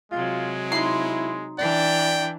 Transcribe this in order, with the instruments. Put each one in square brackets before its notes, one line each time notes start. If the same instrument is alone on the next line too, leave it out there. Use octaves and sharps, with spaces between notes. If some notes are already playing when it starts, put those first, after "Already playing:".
[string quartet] C3 F#3 [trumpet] G#3 [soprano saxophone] F4
[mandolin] D#4 C6 [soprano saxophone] E4
[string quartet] E3 D4 [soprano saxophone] D5 [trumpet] G5